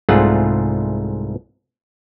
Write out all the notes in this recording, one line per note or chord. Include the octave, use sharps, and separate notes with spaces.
C2 G#2 A3 F4 G#4 F#5